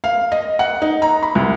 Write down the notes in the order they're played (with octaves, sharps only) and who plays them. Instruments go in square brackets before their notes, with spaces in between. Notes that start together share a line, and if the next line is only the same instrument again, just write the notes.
[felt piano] F5
D#5
F#5
D#4
A#5
B5
C2